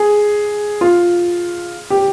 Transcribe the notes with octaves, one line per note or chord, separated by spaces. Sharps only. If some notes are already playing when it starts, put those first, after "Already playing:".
Already playing: G#4
F4
G4